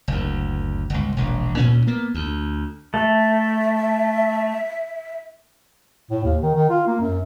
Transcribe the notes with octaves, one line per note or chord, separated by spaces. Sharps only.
F#1 D2
G1 C#2
E1 A#1
D2 A#2 C#4
A#3 B3
D2
A3 E5
A2
D#2
D#3
D#3
F4
A#3
F#2